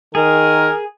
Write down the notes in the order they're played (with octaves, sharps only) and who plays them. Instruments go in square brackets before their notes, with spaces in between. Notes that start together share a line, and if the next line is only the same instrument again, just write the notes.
[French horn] D#3 [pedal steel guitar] G#4 [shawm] A#4